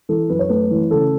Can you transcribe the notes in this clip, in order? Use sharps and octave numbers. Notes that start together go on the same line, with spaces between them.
E3 A4
F#2 B4
C#5
A3 B4
E3
C#3 A4